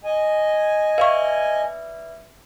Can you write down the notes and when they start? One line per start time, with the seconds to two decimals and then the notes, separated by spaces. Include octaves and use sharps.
0.05 D#5 G#5
0.98 B4 D5 E5 F5 C#6